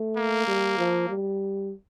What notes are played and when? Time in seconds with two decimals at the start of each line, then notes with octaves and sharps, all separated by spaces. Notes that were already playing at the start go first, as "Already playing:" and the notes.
Already playing: A3
0.17 A#3
0.48 G3
0.78 F3
1.09 G3